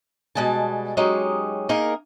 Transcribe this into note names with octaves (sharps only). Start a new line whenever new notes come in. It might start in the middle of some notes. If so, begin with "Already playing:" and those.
B2 G3 G#3 G#5 A5
F#3 G#3 C#4 D#4 G4
A#3 D#4 G#4 A#4